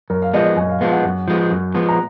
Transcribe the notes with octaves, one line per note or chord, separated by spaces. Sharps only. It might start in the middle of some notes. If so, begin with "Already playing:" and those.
F#2 A#4
F5
F3 G#3 B3 D#5
D#5
F#2 G#5
F5
F3 G#3 B3 F5
F#5
F#2
F3 G#3 B3
F#2
F3 G#3 B3
A#5